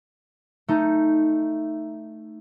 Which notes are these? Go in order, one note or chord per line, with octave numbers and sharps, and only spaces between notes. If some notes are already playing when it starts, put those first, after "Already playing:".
A3 D#4